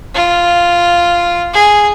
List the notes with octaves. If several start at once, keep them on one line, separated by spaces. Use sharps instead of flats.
F4
G#4